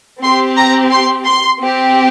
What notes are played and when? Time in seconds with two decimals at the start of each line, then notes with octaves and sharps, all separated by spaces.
0.23 C4 G4 C6
0.57 A#5
0.91 C6
1.25 C6
1.59 C4 G4